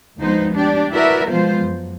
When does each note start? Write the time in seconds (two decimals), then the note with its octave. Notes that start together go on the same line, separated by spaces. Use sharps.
0.19 D2 F3 G#3 B3 D#4 C5
0.54 D4 G4 D5
0.93 E4 F#4 A#4 B4 D5 E5
1.28 B2 F3 G#3 B3 F4 C5
1.60 F#2